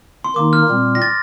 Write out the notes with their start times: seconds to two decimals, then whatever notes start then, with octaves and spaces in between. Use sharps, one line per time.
0.24 C6
0.36 D#3 A#3 D#4 D6
0.53 F6
0.68 A#2 G3 C4
0.95 A#6
1.02 A6